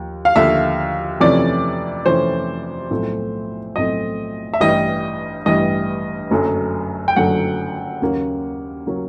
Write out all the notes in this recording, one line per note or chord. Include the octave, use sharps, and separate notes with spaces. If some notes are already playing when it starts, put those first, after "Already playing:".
Already playing: D#2 F3
F5
D#2 D3 F3 E5
F2 C3 E3 A3 C#4 D5
F2 C3 E3 A3 C#4 C5
B1 A2 F3 A3 C4
B1 A2 F3 A3 C4 D#5
E5
A1 G2 E3 G3 D#5
A1 G2 E3 G3 D#5
F#1 F#2 D3 F#3 A3
G5
F#1 F#2 D3 F#3 A3 F#5
D#2 C#3 F#3 A#3 C#4
C#3 F#3 A#3 C#4